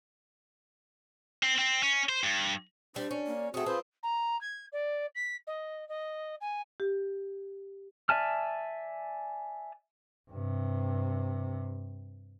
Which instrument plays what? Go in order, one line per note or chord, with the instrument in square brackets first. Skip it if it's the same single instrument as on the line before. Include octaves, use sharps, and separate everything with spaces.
[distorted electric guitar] C4
C4
C#4
C5
G2
[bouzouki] G3 [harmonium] D4 [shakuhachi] C5
[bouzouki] C#4 [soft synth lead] D5
[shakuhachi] A#3
[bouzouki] A3 C#4 [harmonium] C4 F#4 [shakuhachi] G#4 [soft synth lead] D#6
[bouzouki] C4 [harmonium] F4 B4 C5
[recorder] A#5
G#6
D5
B6
D#5
D#5
G#5
[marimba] G4
[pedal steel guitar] D5 E5 G#5 A5 F6
[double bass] G2 C3